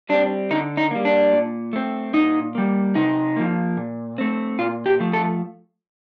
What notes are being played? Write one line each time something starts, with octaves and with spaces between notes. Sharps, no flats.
G3 C4 D4
D3 D#4
D#4
G3 A#3
D4
A#2
A3 C4
A#2 D#4
G3 A#3
C3 D#4
F3 A#3
A#2
A3 C4
A#2 F4
G4
F3 A3
A4